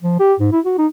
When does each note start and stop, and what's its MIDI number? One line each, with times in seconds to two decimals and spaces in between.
0.03 0.16 53
0.20 0.34 67
0.40 0.51 44
0.52 0.60 64
0.65 0.77 66
0.78 0.87 63